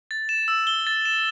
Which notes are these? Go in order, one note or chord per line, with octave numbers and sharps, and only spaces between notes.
A6
E7
E6
G7
A6
E7